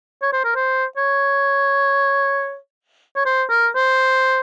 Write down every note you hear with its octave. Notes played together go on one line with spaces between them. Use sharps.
C#5
C5
A#4
C5
C#5
C#5
C5
A#4
C5